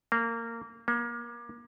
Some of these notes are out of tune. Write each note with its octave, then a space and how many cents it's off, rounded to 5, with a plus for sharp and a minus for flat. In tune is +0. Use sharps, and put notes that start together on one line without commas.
A#3 -20
A#3 +30